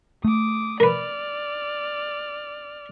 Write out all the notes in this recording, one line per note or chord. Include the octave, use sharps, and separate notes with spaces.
A3 D6 D#6
A#4 B4 D5 F6